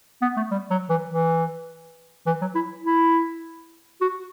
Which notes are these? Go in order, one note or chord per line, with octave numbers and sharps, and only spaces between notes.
B3
A3
G3
F#3
E3
E3
E3
F#3
E4
E4
F#4